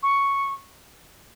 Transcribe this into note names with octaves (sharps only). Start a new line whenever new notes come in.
C#6